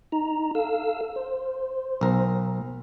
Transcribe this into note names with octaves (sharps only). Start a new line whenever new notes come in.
D#4 A#5
A4 F5 E6
C5
B1 A#4